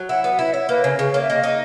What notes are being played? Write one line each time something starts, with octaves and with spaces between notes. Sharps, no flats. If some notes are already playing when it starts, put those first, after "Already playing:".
Already playing: F#3
E4 F#5
B3 F#5
E4 E5
E4 C#5
A#3 B4
C#3 C#5
C#3
A#3 C#5
E5
A#3 D#5
D#4 D#5